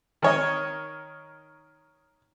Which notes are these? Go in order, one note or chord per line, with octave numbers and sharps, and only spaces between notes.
D#3 C#5 D#5